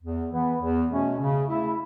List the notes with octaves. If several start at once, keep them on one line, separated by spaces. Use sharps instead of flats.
E2
E3 B3
E2
B2 A3 C#4
C#3
A3 E4